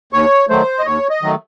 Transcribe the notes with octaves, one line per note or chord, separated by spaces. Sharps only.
D#2 C#5
D#3 F#3 A3 C5
D#5
D#2 C#5
D#5
D#3 F#3 A3